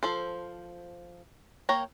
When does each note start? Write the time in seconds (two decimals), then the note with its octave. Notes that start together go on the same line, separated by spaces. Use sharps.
0.03 F3 A4 C5
1.69 A#3 C#5 G5 A#5